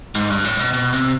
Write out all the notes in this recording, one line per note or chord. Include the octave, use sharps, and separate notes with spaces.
G#2
G2
A2
B2
B2
C3